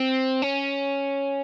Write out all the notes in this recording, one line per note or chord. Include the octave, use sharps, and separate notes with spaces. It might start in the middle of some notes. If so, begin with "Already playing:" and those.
Already playing: C4
C#4